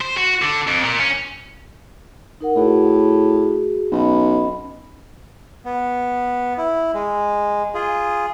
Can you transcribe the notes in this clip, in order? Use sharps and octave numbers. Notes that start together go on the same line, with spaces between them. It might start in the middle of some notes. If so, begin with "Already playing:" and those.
C5
F#4
D3
F2
A#2
C#4
D#4 A#4 F#5
A2 F#4 G#4
B1 C#4 D#5 B5
B3
E4
G#3
F4 G#4